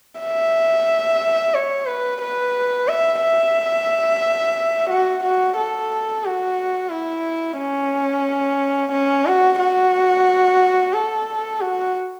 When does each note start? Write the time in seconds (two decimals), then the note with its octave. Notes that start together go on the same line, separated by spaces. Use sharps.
0.20 E5
1.55 C#5
1.88 B4
2.22 B4
2.88 E5
3.22 E5
4.90 F#4
5.23 F#4
5.57 A4
6.25 F#4
6.91 E4
7.58 C#4
8.92 C#4
9.26 F#4
9.59 F#4
10.93 A4
11.60 F#4